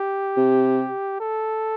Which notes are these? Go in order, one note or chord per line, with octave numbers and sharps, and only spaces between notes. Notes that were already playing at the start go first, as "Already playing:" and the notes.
Already playing: G4
C3
A4